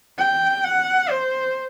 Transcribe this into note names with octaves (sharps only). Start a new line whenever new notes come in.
G5
F#5
C5